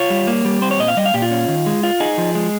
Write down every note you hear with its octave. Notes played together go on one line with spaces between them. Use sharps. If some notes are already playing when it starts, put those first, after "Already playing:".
Already playing: F4 C#5
G3
A#3
G3
C4 C5
C#5
A#2 D#5
F5
G3 D#5
F5
A#2 G4
F4
C#4
D#3
G#3
F4
D#4 G#4
F3
G#3